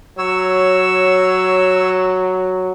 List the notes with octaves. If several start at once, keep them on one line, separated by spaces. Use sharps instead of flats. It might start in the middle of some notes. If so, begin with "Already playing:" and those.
F#3 C#5 E6